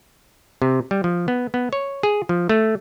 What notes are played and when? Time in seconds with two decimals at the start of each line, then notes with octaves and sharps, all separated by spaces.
0.62 C3
0.91 G3
1.04 F3
1.28 B3
1.54 B3
1.73 C#5
2.03 G#4
2.29 F3
2.49 A3